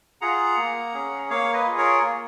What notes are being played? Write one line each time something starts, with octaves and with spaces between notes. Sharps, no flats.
F4 G#4 F#5 A#5
A#3
C#4 G#4
A#3 C#5 F5
B4 D#5
F4 G#4
A#4 C#5
A#3